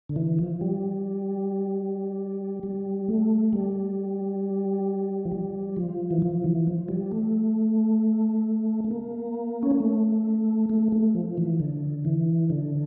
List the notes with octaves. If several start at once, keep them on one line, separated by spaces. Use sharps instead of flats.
D3
E3
F3
G3
G3
A3
G3
F3
G3
F3
E3
F3
E3
F3
G3
A3
A3
A#3
C#4
A#3
A3
A3
A3
F3
E3
D3
E3
D3